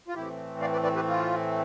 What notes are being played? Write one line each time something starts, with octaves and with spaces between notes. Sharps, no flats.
F4
A2 E3 A3 C4 E4 G4
D5 F5
B4 D5
B4 D5
G4 B4
F4